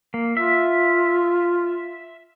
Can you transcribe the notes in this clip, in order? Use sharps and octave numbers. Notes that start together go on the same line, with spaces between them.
A#3
F4 E5